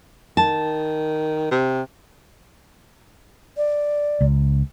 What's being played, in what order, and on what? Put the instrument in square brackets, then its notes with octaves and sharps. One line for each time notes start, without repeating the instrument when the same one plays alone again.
[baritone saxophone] D#3 [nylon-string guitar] A5
[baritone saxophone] C3
[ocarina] D5
[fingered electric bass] C#2